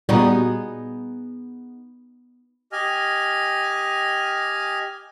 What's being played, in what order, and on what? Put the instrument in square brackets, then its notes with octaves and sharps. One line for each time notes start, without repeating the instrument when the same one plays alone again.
[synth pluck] A#2 G3 F#4 [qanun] B3 D#4 G#4
[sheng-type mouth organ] G4 D#5 G#5 F6